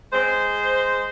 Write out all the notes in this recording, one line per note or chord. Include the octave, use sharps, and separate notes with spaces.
G#3 C5